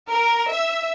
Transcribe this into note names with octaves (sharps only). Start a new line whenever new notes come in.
A#4
E5